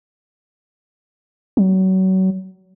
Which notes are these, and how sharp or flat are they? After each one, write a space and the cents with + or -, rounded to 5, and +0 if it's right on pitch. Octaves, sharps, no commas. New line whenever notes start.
F#3 +30